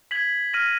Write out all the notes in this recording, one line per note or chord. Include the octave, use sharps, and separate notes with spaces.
G#6 B6 F#7
F6 A#6 D#7 F#7